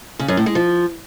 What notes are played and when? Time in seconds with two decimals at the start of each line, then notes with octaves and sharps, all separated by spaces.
0.19 C#3
0.28 F#2
0.37 A2
0.46 G#3
0.55 F3